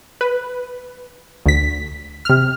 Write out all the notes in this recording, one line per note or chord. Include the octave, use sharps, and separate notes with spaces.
B4
D2 B6
C3 F6